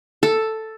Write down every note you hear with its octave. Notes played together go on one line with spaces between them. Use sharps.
A4